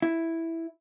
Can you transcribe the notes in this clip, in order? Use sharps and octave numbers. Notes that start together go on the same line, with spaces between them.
E4